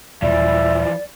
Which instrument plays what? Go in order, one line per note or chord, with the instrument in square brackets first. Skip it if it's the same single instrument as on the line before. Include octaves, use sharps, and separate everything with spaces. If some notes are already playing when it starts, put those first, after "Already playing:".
[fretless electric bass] D#1 [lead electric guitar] E3 F3 [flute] D5 [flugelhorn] E5